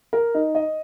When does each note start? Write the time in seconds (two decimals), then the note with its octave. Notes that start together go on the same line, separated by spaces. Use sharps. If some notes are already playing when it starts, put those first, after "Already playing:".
0.13 A#4
0.35 D#4
0.55 D#5